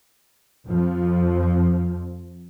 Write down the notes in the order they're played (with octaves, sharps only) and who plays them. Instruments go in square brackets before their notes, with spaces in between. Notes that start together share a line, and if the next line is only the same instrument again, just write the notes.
[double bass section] F2 F3